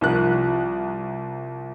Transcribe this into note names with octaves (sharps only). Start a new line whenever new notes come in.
C2 F3 A#4 F#6